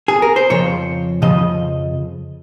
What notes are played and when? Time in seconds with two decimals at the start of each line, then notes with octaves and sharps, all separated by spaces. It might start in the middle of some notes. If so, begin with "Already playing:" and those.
0.08 G#4
0.22 A#4
0.36 C5
0.50 F2 C#3 F3 C#5
1.22 F2 C#3 F3 D#5